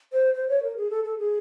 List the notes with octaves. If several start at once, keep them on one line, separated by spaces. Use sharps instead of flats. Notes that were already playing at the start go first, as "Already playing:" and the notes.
C5
C5
C#5
A#4
G#4
A4
A4
G#4